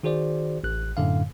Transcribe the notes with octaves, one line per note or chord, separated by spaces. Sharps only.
D#3 F#4 G#4 C5 D5
A1 F#6
F#2 A2 D3 F5